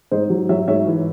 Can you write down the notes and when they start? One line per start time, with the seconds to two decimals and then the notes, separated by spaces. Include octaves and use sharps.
0.11 G#2 C5 D#5
0.30 F#3
0.49 F#3 C#5 E5
0.68 G#2 C#5 E5
0.87 E3